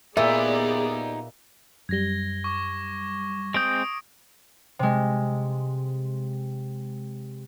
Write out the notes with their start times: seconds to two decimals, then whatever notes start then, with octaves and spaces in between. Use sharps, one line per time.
0.17 A#2 B3 D#4 G4 G#4 D5 E5
1.89 F#2 G3 G#6 A#6 G7
2.44 C#6 D6
3.54 G#3 C4 D#6 G6 D7
4.79 C3 G#3